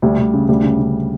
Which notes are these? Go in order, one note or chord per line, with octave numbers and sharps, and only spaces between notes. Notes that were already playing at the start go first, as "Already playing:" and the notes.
D2 G3
D2
C#3
D2 G3
C#3
C#3